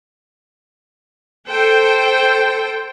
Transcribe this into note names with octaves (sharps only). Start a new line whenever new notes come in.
A4 C5 G5